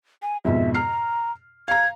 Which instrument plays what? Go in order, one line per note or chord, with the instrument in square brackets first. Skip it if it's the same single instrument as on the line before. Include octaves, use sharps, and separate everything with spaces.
[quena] G#5
[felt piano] F2 G#2 B2 [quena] E5
[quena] A#5 [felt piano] F6 C7
[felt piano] F5 A#5 [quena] G#6